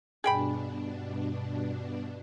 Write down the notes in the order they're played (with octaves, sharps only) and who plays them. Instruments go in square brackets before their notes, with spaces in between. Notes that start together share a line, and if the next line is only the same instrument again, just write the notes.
[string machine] G2 B2 D4 [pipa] G#4 G5 B5